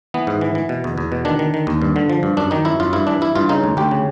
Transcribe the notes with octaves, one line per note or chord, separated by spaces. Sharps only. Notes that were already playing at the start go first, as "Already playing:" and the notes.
E3 B3
G#2
E3
E3
B2
E2
E2
B2
D#3 D4
D#3
D#3
D#2
G2
D3
F3
G2
F#2 D4
D#3 D#4
F#2 E4
F#2 F4
G2 E4
E3 D4
G2 E4
G2 F4
C#3 D#4
D2
D2 G4
C#3